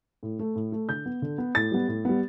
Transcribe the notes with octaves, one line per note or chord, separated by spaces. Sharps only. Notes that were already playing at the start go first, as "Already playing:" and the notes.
A2
A3
A2
A3
D3 G6
B3
D3
B3
A2 A6
G3 B3
A2
G3 B3